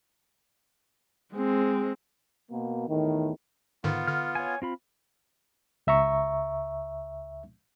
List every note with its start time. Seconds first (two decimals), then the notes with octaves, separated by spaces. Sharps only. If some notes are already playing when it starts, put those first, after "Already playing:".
1.34 G#3 C4
2.50 B2 A#3
2.88 E2 A2 D#3
3.84 G#2 D3 D#3 B3 F4
4.08 D3 F6
4.35 C#5 G#5
4.62 C4 F4 B5
5.87 C#2 E5 A#5 C#6